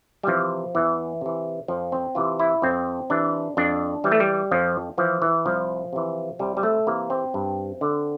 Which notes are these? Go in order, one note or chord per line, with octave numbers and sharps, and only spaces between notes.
G3
C3 E3 F3
E2 E3
C3 E3
F2 F3
C4
C3 E3 F4
E4
F2 C4
C3 E3 D4
F2 D4
E3 G3
A3
G3
F2 F3
E3 F3
E3
C2 F3
C3 E3
C2 G3
G3
A3
C3 E3 A#3
C4
G2
D3